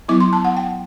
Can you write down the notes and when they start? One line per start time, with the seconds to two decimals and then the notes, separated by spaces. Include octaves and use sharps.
0.08 F#3 B3 E4 D6
0.20 C6
0.33 A5
0.45 F#5
0.57 G5